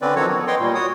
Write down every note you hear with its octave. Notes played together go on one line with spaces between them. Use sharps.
D3 C4 C#4 B4 D5
D#3 F3 F#3 F#4 A4 C#5
B3
B4 C#5 D#5 F#5 G5 C6
A#2 G3
F#4 C#5 D#6